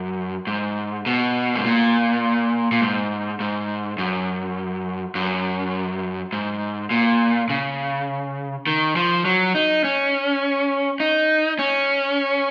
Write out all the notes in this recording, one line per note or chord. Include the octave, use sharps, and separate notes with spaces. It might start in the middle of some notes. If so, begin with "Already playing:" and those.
Already playing: F#2
G#2
B2
G#2
A#2
A#2
G#2
G#2
F#2
F#2
G#2
A#2
C#3
D#3
F3
F#3
D#4
C#4
D#4
C#4